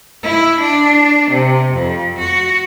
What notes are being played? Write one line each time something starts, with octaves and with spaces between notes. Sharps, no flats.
E4
D4
C3
F2
F#4